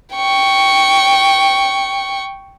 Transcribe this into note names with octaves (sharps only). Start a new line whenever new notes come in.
G5 C#6